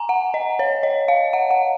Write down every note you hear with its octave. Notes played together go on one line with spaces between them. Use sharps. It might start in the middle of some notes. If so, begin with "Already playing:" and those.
Already playing: G#5 A#5
F#5
D#5
C#5
D#5
F5
F#5
F#5